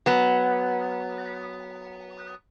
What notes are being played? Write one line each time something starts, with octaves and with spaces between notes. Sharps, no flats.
F#3 B3